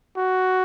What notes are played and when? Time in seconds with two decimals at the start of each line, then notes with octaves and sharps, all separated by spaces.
0.17 F#4